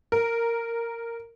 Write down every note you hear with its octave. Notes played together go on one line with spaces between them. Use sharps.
A#4